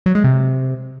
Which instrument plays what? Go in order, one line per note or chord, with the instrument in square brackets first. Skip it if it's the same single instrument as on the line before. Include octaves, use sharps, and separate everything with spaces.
[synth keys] F#3
G#3
C3